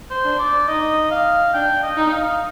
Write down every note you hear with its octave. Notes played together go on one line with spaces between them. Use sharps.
C5
D4
D5
D#4 D#5
F5
D4 G5
D#5
D#4
F5